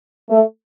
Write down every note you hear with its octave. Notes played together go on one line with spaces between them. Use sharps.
A3